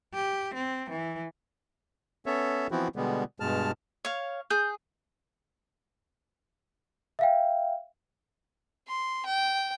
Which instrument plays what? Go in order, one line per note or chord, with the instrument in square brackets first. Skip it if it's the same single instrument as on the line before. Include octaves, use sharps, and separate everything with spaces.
[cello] G4
C4
E3
[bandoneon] B3 C#4 A4 C#5 E5
E3 F3 B3 C4 E4 F#4
B2 D3 G3 G#3 B3
G2 B2 G#3 A5 F6
[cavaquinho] C#5 F5
[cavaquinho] G#4 [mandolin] G6
[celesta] E5 F5 G5
[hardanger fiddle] C6
G5